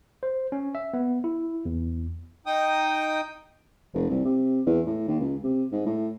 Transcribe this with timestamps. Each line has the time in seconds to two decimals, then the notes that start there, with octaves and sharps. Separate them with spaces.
0.23 C5
0.52 C#4
0.75 E5
0.94 B3
1.24 E4
1.65 E2
2.46 D#4 G5 D#6
3.94 F1
4.10 C2
4.25 C3
4.66 E2
4.86 A2
5.08 D#2
5.20 C#2
5.43 C3
5.72 G#2
5.86 A2